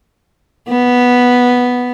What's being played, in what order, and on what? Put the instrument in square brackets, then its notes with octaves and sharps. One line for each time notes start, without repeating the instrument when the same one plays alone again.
[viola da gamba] B3